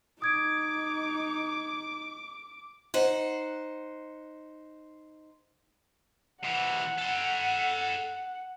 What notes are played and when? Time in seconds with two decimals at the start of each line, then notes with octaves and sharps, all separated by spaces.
0.22 D#4 D6 D#6 G#6 D7
2.94 D#4 C5 F#5
6.43 C3 E3 F#5
6.98 A4 G5